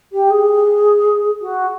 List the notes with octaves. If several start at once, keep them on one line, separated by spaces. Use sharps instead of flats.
G4
G#4
F#4